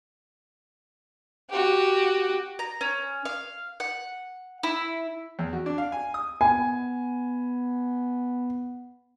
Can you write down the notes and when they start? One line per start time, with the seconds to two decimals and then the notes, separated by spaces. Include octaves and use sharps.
1.50 F#4 G4
2.59 A#5
2.81 C#4
3.25 F5
3.80 F#5
4.63 E4
5.39 E2
5.53 F#4
5.66 D4
5.78 F5
5.92 G#5
6.14 D#6
6.41 B3 G#5